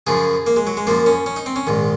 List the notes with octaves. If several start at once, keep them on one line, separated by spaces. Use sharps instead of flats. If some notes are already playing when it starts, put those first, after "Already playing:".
F#2 C#3 F3 G#4
A#3
G#3
F#3
G#3
F#2 F3 A#3
C#4
C#4
D#4
C4
C#4
A#1 G#2 D#3